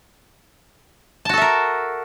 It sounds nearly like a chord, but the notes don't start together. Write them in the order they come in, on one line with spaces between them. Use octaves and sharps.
A5 F#4 A4 E5 A#4